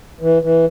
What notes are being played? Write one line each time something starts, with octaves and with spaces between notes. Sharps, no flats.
E3
E3